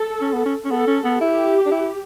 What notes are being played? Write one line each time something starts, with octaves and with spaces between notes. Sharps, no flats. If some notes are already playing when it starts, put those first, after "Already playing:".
Already playing: A4
C#4
B3
C#4
C#4
B3 A4
C#4
B3
E4 G4
D4
E4